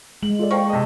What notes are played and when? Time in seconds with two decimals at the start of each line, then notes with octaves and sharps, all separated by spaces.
0.23 G#3 F#7
0.39 F4 A4 D5
0.51 A#3 G#4 C5 G5 A5 C#6
0.69 C3 D#5